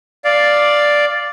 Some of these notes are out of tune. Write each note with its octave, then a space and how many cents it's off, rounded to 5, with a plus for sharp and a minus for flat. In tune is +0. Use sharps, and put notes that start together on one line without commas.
D5 +0 F5 +0